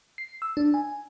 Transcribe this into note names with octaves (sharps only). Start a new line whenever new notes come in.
C7
E6
D4
G#5